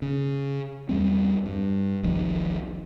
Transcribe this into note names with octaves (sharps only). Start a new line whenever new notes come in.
C#3
E2 G3 C4
G2
E1 B1 D#3 F3